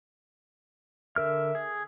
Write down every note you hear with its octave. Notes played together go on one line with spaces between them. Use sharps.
D3 A#4 E5 F6
G#4